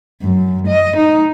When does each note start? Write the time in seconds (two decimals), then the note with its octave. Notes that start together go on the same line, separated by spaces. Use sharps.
0.22 F#2
0.67 D#5
0.97 D#4